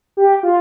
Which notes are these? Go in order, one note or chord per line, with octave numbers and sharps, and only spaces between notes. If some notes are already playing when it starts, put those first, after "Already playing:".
G4
F4